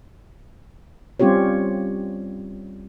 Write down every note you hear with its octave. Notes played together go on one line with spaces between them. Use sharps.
G3 C4 C#4 F4 G4 C#5